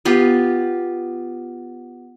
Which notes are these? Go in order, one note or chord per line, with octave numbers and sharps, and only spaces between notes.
B3 F4 G4